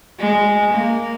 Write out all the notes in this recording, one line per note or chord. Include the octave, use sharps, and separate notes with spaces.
G#3
A#3